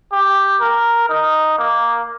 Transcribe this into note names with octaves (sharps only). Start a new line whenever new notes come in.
G4
A#4
D#4
A#3